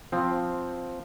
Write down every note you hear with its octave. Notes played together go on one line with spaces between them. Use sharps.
F3 C4